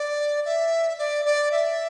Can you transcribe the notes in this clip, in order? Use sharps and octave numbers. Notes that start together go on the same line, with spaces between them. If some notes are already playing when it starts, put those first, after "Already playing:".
Already playing: D5
E5
D5
D5
E5